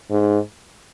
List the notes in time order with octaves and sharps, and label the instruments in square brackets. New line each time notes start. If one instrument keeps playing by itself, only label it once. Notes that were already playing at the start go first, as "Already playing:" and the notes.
[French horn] G#2